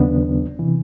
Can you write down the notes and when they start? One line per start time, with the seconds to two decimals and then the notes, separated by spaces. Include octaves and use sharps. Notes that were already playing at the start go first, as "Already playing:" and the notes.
Already playing: D#2 C#3 F#3 B3 D4
0.59 C3 E3